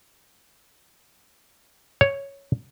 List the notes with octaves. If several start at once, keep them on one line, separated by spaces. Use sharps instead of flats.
C#5